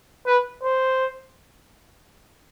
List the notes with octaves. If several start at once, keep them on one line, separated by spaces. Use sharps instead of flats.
B4
C5